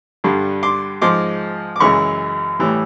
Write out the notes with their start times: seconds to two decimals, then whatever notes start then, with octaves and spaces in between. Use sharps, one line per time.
0.24 G2 D3 G3
0.63 C6 D6
1.02 G#2 F3 G#3 C6 D6
1.76 D6
1.80 F#2 C#3 E3 G#3 B5 C#6
2.59 A2 E3 G3